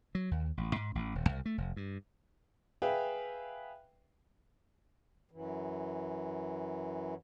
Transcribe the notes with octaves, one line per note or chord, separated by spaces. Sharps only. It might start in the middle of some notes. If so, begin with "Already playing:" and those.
F#3
D#2
A1
G#2
A1
D#1
C2
A3
F1
G2
G#4 B4 E5 F5 G5
F#2 E3